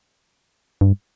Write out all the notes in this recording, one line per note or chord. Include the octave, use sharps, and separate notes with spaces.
G2